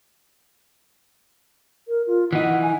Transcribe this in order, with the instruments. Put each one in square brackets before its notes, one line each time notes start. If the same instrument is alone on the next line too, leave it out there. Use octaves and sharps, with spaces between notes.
[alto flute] A#4
F4
[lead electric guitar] E3 D#4 [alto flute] F#5
[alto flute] G#5